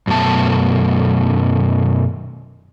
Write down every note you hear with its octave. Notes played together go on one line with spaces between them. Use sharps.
F#2 B2 A3 A5